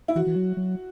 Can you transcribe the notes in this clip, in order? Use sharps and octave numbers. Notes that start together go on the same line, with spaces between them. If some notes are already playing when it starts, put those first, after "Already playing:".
E4
E3 F#4
E3
F#3
F#3